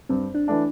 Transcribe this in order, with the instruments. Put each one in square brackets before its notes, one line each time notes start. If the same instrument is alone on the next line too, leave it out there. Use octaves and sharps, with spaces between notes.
[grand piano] G2 [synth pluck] C4
[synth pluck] D4
[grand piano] E3 A3 D4